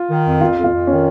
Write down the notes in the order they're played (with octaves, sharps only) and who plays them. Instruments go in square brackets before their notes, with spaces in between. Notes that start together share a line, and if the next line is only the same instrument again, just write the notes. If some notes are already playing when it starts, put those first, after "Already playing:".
Already playing: [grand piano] F4
[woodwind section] D#3
F2
[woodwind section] F2 [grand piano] F4
[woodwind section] F2
[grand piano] F4
[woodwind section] F2
[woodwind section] D#3 [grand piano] C#4